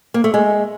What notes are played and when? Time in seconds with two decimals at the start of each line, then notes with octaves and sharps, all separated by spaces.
0.14 A#3
0.24 A3
0.34 G#3